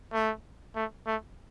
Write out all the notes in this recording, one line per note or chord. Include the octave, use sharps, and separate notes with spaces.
A3
A3
A3